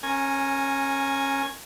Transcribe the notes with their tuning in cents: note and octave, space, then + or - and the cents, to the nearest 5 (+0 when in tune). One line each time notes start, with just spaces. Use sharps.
C#4 -25 A#4 +0 G#5 +0